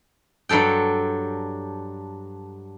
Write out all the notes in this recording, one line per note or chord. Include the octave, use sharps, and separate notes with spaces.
G2 F#3 A4 G5